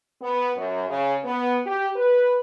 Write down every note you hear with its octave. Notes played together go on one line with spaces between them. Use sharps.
B3
F#2
C#3
B3
G4
B4